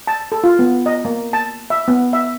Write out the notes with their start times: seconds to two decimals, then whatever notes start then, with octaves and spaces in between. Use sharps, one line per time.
0.07 A5
0.32 A4
0.44 F4
0.59 B3
0.86 D#5
1.05 A#3
1.33 A5
1.70 E5
1.88 B3
2.13 E5